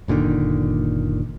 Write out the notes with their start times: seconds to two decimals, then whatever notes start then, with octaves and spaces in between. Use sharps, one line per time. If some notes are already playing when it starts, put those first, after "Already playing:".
0.08 F#1 A#2 D3 D#3